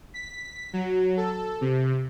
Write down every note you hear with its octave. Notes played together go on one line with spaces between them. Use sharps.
B6
F#3
A4
C3